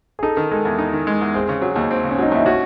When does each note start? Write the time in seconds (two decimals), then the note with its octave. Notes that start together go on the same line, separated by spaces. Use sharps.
0.19 G#4
0.23 D#4 A4
0.37 D#3
0.51 G#3 A4
0.65 E2
0.78 D#4
0.93 D#3
1.07 G#3
1.21 E2
1.34 C4 G#4
1.49 C#3
1.62 F#3
1.76 D#2
1.91 C4
2.04 C#3
2.11 C#4
2.18 F#3 D#4
2.32 D#2 E4
2.46 C#4 F#4